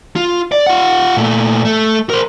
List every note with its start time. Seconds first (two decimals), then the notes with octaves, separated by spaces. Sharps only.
0.16 F4
0.52 D5
0.66 F4 F#5
1.17 A#2 A3
1.65 A3
2.10 A#4 C5